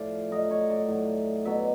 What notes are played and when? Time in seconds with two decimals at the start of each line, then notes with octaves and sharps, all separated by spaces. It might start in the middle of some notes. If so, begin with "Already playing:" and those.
Already playing: A2 F3 D5 F5
0.31 A2 F#3 D#5
0.51 C#5
0.70 D5
0.88 A2 F#3
1.45 B2 F#3 E5